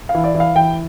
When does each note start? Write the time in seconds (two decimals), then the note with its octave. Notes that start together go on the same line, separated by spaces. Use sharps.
0.09 F5
0.14 E3
0.24 D5
0.35 E3
0.40 F5
0.55 E3 G5